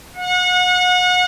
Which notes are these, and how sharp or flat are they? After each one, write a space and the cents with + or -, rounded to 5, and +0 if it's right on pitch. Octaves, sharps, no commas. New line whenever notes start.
F#5 -35